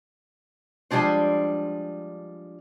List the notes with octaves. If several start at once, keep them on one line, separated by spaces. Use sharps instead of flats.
F3 G3 G#3 D4 C5